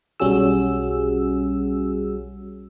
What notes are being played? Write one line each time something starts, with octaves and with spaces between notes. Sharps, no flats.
B1 G3 C#4 F#4 G#4 E6